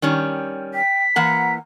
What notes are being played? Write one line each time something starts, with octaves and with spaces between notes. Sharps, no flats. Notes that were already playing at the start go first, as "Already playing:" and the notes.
D#3 G3 C#4
G5 B6
E3 A#3 F#5 A#5